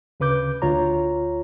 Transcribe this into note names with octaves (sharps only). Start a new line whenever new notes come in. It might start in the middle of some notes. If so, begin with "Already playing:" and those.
D2 C#3 B4 D6 G6
D2 F4 C#5 A#5